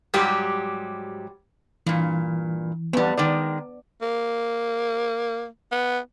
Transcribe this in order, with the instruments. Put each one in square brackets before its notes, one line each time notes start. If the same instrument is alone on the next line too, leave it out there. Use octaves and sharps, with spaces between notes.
[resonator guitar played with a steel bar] G#2 F#3 G3 G4
[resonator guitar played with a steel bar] G2 A#2 [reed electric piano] E3
[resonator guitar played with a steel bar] F2 G3 [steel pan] B3 D4
[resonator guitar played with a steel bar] D#3 G#3 [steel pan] D5
[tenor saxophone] A#3
B3